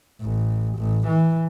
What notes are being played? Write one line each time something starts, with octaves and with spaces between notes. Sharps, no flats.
A1
A1
E3